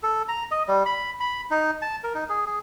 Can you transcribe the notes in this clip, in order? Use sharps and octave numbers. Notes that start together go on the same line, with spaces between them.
A4
A#5
D#5
G3
B5
B5
D#4
A5
A#4
D#4
G#4
G#4